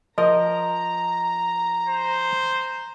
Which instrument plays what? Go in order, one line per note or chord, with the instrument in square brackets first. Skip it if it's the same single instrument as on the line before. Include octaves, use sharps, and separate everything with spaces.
[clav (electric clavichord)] F3 A#4 [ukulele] D#5 [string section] A#5
[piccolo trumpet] C5